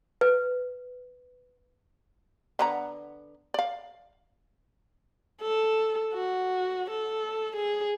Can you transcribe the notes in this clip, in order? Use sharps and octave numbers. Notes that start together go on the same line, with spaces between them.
B4
D3 B3 A#5
D5 F5
A4
F#4
A4
G#4